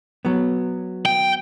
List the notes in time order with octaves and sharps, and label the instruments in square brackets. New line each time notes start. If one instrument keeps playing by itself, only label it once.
[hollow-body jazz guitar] F#3 B3
[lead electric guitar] G5